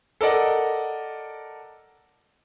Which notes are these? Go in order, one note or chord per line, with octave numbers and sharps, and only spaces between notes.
A4 A#4 D5 D#5 F#5